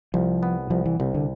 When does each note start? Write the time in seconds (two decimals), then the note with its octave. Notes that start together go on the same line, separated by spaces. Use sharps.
0.14 C2 F3
0.43 B3
0.70 C2 F3
0.86 E3
1.00 C2 C3
1.14 D3